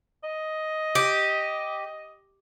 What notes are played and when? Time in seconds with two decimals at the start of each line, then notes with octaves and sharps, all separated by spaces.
0.24 D#5
0.95 G4